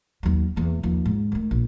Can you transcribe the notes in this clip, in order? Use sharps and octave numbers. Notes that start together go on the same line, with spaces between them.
D#2 F#3
E2 A#3
D#2 F3
G#2
D#3 A3
A#1